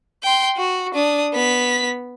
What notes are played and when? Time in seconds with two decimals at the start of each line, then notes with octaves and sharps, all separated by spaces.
0.23 G5 C6
0.57 F#4
0.94 D4 D#6
1.33 B3 B6